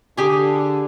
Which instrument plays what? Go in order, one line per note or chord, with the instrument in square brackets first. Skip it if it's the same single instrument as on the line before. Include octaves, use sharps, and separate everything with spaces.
[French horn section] D3 [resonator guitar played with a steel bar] G4 G#4